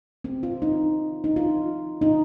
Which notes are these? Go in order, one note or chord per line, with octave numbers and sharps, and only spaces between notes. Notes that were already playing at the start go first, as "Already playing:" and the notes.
C4
F4
D#4
D#4
F4
D#4